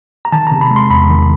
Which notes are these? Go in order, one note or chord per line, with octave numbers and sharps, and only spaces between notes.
A#5
D#3 A5
C3 A#5
B5
G#3
C6
E2 B5
D#3